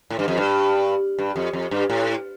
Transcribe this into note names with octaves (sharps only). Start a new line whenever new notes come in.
A2
G2
F2
G2
G2
F2
F2
G2
A2